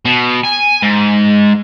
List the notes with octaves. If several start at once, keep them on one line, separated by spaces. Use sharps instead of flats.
B2
G#5
G#2